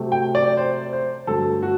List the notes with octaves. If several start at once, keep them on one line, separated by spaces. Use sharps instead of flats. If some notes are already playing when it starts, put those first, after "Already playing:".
Already playing: C3 F#3 A3 C4
G5
D5
C5
C5
G2 D3 F#3 A3 A4
F#4